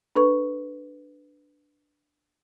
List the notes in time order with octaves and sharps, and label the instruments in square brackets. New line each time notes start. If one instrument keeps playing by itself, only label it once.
[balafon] D4 A4 B4 C#6